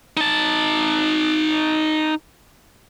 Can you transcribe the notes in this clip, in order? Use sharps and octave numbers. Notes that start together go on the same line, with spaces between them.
D#4 A5